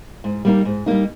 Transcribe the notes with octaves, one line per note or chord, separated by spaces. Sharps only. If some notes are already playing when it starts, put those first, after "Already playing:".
G#2
G3 A#3 D#4
G#2
G3 A#3 D#4